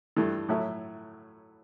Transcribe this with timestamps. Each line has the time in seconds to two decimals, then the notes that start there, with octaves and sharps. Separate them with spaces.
0.16 G2 E3 A3
0.49 A2 F#3 A3 E4